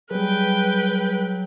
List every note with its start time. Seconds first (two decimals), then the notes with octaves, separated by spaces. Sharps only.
0.11 F#3 G3 G#4 B4 G5